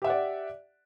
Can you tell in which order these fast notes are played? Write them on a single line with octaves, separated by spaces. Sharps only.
G4 E5 F#5 D5